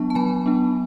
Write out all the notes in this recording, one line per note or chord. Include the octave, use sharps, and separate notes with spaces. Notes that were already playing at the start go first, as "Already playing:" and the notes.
Already playing: F#3 B3 D4 A5 C#6
A5
F#3 G#5 B5
B3 D4